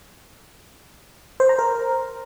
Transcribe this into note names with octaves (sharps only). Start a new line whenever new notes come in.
C5
A#5
A#4